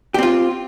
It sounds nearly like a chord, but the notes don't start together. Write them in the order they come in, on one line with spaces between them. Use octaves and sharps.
G4 C4 F4